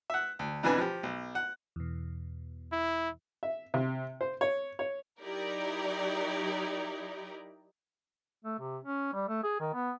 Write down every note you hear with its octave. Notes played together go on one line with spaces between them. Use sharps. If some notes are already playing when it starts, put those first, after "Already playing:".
E5 F#5
D2
F2 B2 E3 D4 B4 G#5
F3 G4
B1
F#5
E2 B2
E4
E5
C3
C5
C#5
C#5
F#3 D#4 E4 G4 A#4 D5
A3
C3
C#4
G3
A3
G#4
D#3
B3